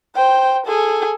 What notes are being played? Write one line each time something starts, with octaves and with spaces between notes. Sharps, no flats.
C5 G5
G#4 A4